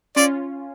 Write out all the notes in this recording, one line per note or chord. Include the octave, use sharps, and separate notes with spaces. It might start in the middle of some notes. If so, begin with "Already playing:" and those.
C#4 F4 D5